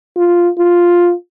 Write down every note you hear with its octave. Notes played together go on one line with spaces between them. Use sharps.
F4
F4